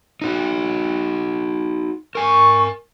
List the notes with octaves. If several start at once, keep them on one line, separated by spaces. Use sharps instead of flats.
D#4 F#4
A#4 G#5 C#6